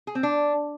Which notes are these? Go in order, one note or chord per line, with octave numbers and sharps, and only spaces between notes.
G#4
C4
D4